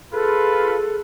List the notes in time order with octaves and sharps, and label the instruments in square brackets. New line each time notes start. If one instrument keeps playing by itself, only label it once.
[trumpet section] F4 B4 [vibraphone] G#4 [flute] A4